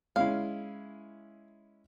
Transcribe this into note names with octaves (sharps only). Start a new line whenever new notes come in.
G#3 C#4 E4 F5